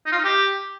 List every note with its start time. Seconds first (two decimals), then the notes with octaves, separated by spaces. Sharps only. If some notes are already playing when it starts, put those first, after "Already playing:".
0.06 D#4
0.12 F4
0.18 D#4
0.24 G4